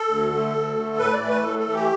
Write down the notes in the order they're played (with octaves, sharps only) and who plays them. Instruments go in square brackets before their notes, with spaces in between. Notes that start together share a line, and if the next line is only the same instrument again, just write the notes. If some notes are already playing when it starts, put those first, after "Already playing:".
Already playing: [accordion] A4
D2
D3 A3
D2
D3 A3
A2 B4
D5
E3 A3
B4
A2 A4
A4
E3 A3
G4